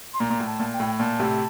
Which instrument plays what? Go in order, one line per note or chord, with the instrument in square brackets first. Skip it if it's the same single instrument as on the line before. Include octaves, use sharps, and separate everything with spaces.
[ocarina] C6
[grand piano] A#2 [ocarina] A#5
[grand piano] A#2
A2
[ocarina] A5
[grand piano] A#2
[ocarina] G5
[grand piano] A2
[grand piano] A#2 [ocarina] A5
[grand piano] A2 C3